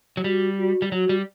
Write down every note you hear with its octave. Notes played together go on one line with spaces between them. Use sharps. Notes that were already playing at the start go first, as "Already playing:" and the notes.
F#3
G3 F#4
F#4
G3
F#3 F#4
G3